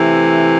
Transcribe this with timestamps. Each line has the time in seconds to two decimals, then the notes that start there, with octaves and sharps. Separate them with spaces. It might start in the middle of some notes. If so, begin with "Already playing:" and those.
Already playing: C3 E3 A3